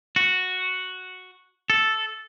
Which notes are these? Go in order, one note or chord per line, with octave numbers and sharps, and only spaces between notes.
F#4
A4